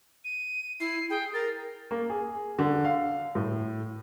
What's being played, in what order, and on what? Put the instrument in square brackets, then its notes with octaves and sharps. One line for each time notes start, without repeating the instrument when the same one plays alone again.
[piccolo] D#7
[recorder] E4 [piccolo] C7
[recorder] G#4 [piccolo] G5
[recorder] A#4 [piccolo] A6
[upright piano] A#3
G#4
D3
F5
A2